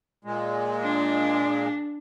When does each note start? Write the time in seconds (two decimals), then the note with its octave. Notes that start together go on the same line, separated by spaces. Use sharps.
0.25 A#2 G#3
0.83 D4